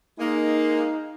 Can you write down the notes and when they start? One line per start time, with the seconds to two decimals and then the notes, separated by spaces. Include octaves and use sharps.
0.19 G#3 A#3 D#4